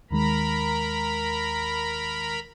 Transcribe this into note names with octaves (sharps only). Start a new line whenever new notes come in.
D#2 D#3 G#3 A#4 A#5 B5